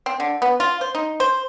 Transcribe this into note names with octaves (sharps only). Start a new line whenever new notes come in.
C4
D3
B3
F4
C5
D#4
C5